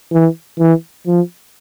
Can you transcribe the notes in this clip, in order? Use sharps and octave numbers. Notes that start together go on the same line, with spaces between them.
E3
E3
F3